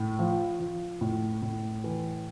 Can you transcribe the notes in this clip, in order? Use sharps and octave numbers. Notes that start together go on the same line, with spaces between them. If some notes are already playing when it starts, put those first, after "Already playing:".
Already playing: A2
F3
F3
A2
A2
E3